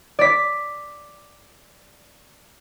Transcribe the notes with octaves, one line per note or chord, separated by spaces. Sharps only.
D5 B6